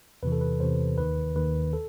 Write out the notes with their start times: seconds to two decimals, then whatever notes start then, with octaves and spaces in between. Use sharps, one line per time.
0.23 E2 C3 E3 B4
0.32 A4
0.41 B4
0.60 E2 C3 E3 C5
0.98 D#2 D#3 B4
1.36 D#2 D#3 B4
1.73 A4